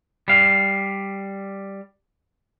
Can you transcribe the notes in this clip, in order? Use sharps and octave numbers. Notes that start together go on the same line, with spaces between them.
G3 F5